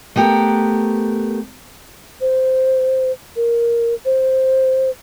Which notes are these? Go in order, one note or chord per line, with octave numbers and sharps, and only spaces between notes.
A3 B3 G4 A#4
C5
A#4
C5